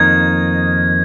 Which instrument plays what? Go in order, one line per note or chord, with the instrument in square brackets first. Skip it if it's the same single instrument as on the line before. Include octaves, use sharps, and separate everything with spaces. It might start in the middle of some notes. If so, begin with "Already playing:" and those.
Already playing: [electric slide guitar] F2 D#3 A#3 D#4 [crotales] G#6